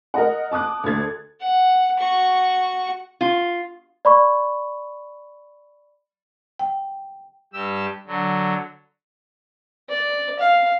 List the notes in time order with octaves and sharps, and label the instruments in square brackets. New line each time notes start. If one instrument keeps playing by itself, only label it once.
[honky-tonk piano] A#4 D#5 F#5
A5 D6 D#6 F#6
D2 A4 G#6 A6
[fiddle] F#5
F#4 C#6
[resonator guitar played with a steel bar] F4
[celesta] D5 B5 C#6
[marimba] G5
[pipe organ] G2 G4 E6
D3 F#3
[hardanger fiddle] D5
F5